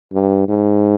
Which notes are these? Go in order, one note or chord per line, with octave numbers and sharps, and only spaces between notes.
G2
G#2